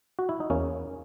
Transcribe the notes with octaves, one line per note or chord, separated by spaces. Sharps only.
F#4
E4
D#4
E2 A#3 C#4